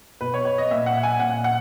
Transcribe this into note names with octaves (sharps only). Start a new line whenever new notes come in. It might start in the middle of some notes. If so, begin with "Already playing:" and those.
B2 B4
C#5
C#5
D#5
A#2 E5
F#5
G#5
A#2 F#5
F#5